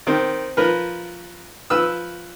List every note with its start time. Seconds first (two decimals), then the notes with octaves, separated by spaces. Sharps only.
0.07 D#3 C4
0.57 F3 A#4 B4
1.70 F3 B4 E6